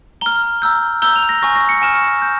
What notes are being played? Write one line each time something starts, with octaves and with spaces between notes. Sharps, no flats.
A#5 F6 G7
A#5 E6 G6
A#5 E6 G6 G7
F7
A#6
G#5 C#6 F6 A#6
A#6
C#7
G#5 C#6 F6 E7
G6